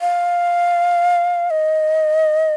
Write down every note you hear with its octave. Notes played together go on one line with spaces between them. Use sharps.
F5
D#5